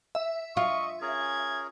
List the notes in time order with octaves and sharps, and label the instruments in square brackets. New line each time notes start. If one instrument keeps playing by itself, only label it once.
[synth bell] E5
[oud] F4 [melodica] D#5 [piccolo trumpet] C#6
[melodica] C#4 G#4 A#4 [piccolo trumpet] G#6